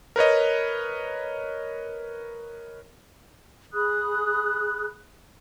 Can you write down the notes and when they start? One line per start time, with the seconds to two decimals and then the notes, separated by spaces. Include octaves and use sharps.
0.16 A#4 B4 C#5 D#5
3.73 G#4 B5 D#6 F#6